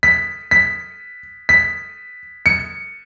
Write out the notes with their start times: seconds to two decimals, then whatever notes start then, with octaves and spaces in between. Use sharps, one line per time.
0.03 B6
0.51 B6
1.49 B6
2.46 C#7